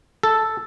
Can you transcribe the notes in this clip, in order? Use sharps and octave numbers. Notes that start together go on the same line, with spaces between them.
A4